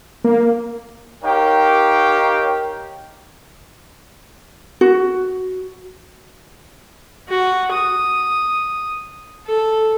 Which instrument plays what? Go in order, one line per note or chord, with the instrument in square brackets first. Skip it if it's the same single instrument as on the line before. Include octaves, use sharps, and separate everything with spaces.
[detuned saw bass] A#3
[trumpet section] D#4 G4 A#4 C#5 F5 G5
[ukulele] F#4
[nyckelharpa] F#4
D#6
A4